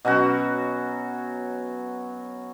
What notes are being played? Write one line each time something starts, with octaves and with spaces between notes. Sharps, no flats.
B2 F#3 C#4 F#4